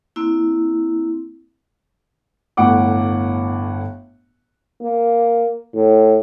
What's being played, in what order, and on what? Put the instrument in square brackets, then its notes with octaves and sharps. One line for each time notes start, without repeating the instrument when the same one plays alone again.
[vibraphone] A#3 C4 E4
[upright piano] G1 A2 F#5 D6
[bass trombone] A#3
A2